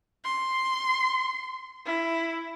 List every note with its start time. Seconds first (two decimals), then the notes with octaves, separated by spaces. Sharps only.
0.24 C6
1.86 E4